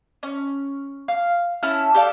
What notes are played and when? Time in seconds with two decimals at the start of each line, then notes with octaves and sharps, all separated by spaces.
0.23 C#4
1.08 F5
1.63 C#4 E4 A5 F6
1.94 G4 A4 D5 F5